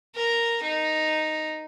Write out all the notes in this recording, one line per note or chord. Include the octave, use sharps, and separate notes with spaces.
A#4
D#4